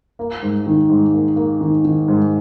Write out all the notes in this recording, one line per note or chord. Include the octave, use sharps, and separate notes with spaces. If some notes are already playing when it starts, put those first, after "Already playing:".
A#3
G#2
D#3
G#2
A#3
A#3
D#3
D#3
G#2